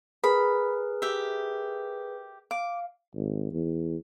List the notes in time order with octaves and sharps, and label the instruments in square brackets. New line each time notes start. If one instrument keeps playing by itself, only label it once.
[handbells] G#4 A#4 B4 [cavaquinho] B5
[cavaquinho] G4 E5
[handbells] F5 [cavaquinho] D6
[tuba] G#1
E2